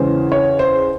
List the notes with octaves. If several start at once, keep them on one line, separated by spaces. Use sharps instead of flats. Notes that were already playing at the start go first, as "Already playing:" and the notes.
Already playing: E2 C#3 E3 G#3 C#4 C5
C#5
C5